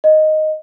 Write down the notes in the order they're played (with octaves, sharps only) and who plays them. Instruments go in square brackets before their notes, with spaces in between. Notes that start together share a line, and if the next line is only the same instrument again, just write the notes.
[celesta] D#5